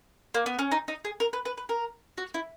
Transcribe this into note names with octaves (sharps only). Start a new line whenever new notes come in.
A#3
B3
C#4
D#4
D#4
G#4
A#4
B4
B4
B4
A#4
F#4
E4